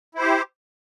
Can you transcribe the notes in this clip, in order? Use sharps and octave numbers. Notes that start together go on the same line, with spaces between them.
E4 G4 C5